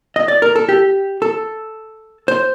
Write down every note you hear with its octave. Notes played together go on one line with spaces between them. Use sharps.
D#5
D5
A#4
A4
G4
A4
C5